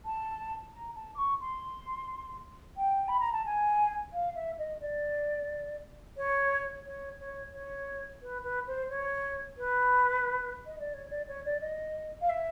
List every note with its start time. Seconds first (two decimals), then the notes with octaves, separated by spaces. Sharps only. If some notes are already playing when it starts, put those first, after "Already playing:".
0.05 A5
0.73 A#5
0.95 A5
1.14 D6
1.18 C#6
1.40 C6
2.77 G5
3.07 B5
3.19 A#5
3.32 A5
3.45 G#5
4.13 F5
4.35 E5
4.58 D#5
4.80 D5
6.16 C#5
6.85 C#5
7.19 C#5
7.52 C#5
8.21 B4
8.43 B4
8.66 C5
8.89 C#5
9.57 B4
10.66 D#5
10.78 D5
10.93 C#5
11.10 D5
11.27 C#5
11.45 D5
11.60 D#5
12.21 F5
12.29 E5